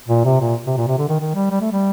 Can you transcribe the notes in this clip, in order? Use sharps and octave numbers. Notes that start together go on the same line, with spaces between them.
A#2
C3
A#2
C3
A#2
C3
D3
D#3
D#3
G3
G3
A3
G3